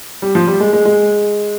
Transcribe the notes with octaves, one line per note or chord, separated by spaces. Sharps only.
G3
F3
G3
G#3
G#3
G#3